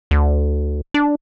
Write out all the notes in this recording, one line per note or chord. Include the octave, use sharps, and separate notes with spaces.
D2
D4